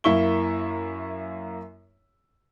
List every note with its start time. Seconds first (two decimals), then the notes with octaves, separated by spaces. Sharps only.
0.04 F#2 A#3 E4 E5 C#6 G7